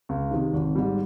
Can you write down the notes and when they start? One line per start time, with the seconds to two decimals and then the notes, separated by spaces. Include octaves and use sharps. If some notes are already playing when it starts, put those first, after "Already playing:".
0.09 C#2
0.31 C3 D#3
0.54 G#1
0.75 G#2 G3